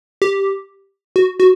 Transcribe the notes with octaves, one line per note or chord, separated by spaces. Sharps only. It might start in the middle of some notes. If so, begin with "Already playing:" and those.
G4
F#4
F#4